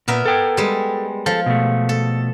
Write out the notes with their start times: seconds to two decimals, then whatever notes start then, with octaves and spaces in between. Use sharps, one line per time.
0.08 A#2 B3 A#4 E5
0.26 A4 G5
0.57 G3 G#3
1.26 F3 A4
1.46 B2 A3
1.89 A4